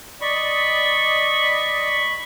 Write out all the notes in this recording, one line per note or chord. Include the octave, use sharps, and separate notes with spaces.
D5 D#5 B5 C#6